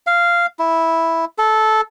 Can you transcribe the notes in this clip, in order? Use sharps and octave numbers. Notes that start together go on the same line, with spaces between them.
F5
E4
A4